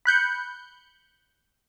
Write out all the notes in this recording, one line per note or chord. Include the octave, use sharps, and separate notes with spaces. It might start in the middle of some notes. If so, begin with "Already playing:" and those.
B5 F#6 G6 C#7